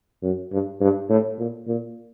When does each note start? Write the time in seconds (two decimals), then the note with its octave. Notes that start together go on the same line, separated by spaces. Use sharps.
0.23 F#2
0.52 G2
0.81 G2
1.09 A2
1.38 A#2
1.68 A#2